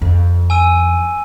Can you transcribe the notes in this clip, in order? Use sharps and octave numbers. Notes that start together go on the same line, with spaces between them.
F2
G#5 E6 D#7